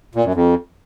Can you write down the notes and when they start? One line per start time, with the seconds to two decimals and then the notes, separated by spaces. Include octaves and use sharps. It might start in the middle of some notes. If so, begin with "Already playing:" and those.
0.15 A#2
0.25 F#2
0.34 F2